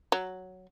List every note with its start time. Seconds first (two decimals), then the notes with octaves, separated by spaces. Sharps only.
0.12 F#3